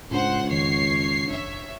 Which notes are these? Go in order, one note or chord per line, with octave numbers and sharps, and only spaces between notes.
C#2 A2 D4 C5 F#5
F2 D#3 C#5 C7
F#1 D4 C#5 E5